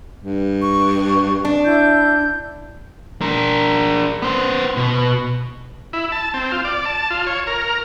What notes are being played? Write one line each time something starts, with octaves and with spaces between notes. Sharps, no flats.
G2
C#6
D4
E4 G6
D4 A#4
B3 C5
B2
E4
A5
C4
F4
D5
A5
F4
C#5
A#4